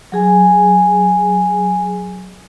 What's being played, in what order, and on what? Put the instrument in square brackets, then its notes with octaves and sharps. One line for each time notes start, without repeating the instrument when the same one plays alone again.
[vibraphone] F#3 G#4 G#5